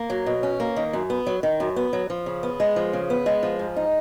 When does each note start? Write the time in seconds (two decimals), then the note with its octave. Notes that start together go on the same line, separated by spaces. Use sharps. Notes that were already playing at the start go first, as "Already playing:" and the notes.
Already playing: A#3
0.10 F#3
0.26 B2
0.43 C#4
0.60 A#3
0.76 D#3
0.93 F#2
1.10 B3
1.27 F#3
1.43 D#3
1.60 F#2
1.76 B3
1.93 F#3
2.10 F3
2.26 C#3
2.43 B3
2.60 G#3
2.76 F3
2.93 C#3
3.10 B3
3.26 G#3
3.43 F3
3.59 G#2
3.76 D#4